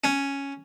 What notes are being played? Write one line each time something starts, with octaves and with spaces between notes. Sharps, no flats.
C#4